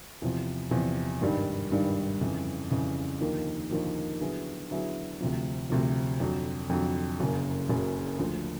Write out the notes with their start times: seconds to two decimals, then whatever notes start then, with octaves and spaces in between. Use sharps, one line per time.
0.22 E2 C3 F3
0.71 E2 C3 F3
1.21 G#1 G2 D#3 G3
1.71 G#1 G2 D#3 G3
2.21 F2 C#3 E3
2.71 F2 C#3 E3
3.21 D#2 D3 F3 A#3 D#4
3.71 D#2 D3 F3 A#3 D#4
4.20 D3 F#3 B3 E4 G#4
4.71 D3 F#3 B3 E4 G#4
5.21 D2 C3 F3
5.70 D2 C3 F3
6.20 F2 D3 F#3
6.69 F2 D3 F#3
7.20 F#1 F#2 C#3
7.69 F#1 F#2 C#3
8.19 D2 D3 F3